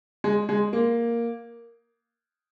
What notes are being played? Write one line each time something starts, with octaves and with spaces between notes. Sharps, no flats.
G#3
G#3
A#3